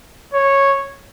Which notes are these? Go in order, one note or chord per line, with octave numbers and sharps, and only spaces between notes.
C#5